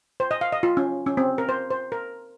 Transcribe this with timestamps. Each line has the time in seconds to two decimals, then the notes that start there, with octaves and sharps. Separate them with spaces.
0.20 C5
0.31 D#5
0.41 F5
0.52 D#5
0.63 F4
0.77 C#4
1.06 C#4
1.17 C4
1.38 A#4
1.49 C5
1.71 C5
1.92 A#4